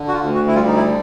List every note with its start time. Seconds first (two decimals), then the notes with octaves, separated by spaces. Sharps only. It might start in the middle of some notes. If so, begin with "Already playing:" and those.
Already playing: D3
0.08 F#4
0.13 F4
0.23 D2
0.34 F#4
0.48 E4
0.55 G3 F4
0.67 D#4
0.76 E4
0.86 D3